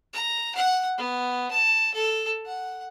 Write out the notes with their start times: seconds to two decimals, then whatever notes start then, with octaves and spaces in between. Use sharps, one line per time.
0.13 A#5
0.55 F#5
0.98 B3
1.51 A5
1.94 A4
2.46 F#5